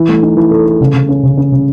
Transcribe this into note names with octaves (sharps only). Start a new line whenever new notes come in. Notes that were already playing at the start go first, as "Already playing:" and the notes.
Already playing: E3
A3
D#4
E3
A4
A4
C#3
C#3
C#4
C#3
C#4
C#3